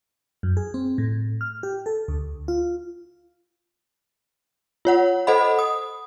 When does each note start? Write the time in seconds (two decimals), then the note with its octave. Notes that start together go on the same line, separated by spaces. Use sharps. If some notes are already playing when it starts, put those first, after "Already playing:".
0.43 F#2
0.57 G#4
0.74 C4
0.98 A2
1.41 F6
1.63 G4
1.86 A4
2.08 D2
2.48 F4
4.85 F4 C#5 F#5
5.27 A4 C5 D#5 F#5 B5
5.59 D#6